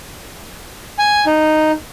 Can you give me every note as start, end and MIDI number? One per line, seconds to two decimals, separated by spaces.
0.99 1.25 80
1.26 1.72 63